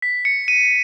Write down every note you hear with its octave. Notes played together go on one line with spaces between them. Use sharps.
B6
C#7
D#7